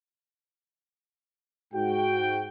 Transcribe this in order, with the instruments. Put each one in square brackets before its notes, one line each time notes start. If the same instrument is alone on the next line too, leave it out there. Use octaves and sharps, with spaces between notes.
[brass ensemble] G#2 F#4 G5